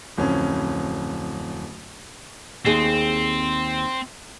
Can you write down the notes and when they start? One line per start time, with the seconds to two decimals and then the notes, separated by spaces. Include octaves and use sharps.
0.17 D1 F2 C#4
2.66 D#2 C4 G#4